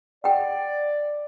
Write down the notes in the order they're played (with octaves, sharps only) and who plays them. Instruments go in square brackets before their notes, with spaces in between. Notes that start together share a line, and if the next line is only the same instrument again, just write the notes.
[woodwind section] D5 [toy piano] F#5 G5